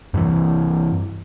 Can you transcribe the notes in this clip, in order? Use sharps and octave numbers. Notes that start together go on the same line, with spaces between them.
G2 E3